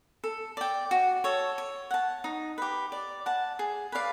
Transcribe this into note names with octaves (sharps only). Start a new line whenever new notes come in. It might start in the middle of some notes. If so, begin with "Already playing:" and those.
A4
D5 G5
F#4
A4 C#5
C#5
F#5 A5
D#4
G4 B4
D5
F#5 A5
G#4
B4 D5 F5